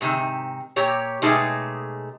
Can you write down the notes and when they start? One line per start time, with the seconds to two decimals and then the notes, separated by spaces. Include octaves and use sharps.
0.01 G#2 C3 D#3
0.76 A#2 G4 C#5 A#5
1.22 B2 G#3 A3 D#4 G4 G#4